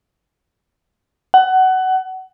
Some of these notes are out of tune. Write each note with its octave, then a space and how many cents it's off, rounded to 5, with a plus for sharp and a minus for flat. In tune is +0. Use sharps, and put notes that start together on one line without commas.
F#5 +20